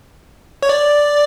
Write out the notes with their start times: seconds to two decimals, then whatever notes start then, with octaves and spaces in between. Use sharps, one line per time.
0.63 C#5
0.69 D5